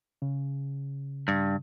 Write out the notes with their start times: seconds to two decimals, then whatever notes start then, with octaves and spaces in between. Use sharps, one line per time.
0.22 C#3
1.28 G2